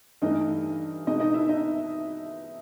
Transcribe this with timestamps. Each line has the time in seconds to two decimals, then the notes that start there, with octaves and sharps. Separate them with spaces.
0.22 G2 E3 A3 D#4 D#5
1.07 B2 G#3 B3 D#4 D#5
1.20 D#4 D#5
1.34 E4 E5
1.49 D#4 D#5